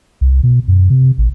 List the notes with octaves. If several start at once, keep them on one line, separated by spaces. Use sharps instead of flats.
C2
B2
F#2
C3
A1